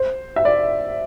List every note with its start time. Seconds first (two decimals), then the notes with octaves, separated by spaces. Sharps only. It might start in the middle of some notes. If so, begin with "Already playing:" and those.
Already playing: C5
0.36 E5
0.45 D5